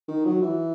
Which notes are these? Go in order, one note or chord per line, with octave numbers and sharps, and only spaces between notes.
D#3
F#3
E3